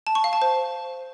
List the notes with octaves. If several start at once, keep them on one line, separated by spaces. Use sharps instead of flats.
A5
C#6
F5
A5
C5